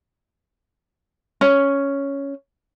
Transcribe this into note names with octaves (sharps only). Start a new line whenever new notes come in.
C#4